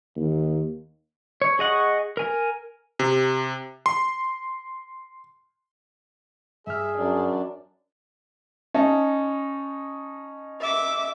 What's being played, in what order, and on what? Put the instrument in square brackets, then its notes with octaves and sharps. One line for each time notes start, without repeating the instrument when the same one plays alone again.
[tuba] D#2
[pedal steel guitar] C#5
G#4 D#5 F#5 C#6
A#4 G#5
[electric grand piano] C3
C6
[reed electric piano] G2 F6 [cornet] G#4 [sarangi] E5
[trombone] F#2 [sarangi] D4
[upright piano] C#4 D#4 A5
[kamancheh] E5 D6